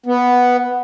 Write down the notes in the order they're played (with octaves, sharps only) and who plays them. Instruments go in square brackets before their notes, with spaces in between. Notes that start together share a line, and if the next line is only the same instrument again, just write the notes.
[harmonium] B3